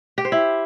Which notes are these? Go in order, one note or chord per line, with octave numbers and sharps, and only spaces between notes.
G4
C5
E4